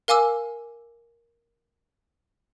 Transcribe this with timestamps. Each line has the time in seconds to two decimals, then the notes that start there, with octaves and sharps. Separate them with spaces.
0.08 A#4 F5 G#5 D6 E6